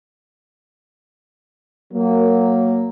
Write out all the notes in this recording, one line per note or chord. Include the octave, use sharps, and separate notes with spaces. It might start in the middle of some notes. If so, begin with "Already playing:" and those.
F#3 A#3